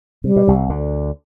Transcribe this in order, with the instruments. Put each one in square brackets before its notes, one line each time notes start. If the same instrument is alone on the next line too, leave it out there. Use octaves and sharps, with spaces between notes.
[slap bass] C3 [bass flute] G3
[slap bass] B2
C2 C3
D2 D3